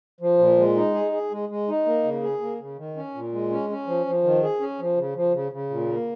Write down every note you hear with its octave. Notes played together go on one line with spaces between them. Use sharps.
F3
A#2
G#3
D#4
G#4
G#4
G#3
G#3
D#4
A#3
C#3
G#4
A#3
C#3
D#3
C#4
A#2
G#3
C#4
C#4
F3
F3
D#3
G#4
C#4
F3
C#3
F3
C#3
C#3
A#2
A#3